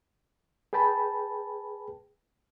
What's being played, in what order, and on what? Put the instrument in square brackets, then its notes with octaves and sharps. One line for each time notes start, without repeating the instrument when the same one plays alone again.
[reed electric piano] G#4 B4 G5 A5 B5